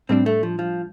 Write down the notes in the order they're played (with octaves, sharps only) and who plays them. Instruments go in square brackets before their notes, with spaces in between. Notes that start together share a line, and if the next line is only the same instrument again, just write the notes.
[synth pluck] A2 G3 D4 [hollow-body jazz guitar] C4
[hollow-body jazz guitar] A3
F3
F3